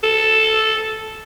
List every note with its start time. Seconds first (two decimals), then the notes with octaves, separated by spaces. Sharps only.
0.03 A4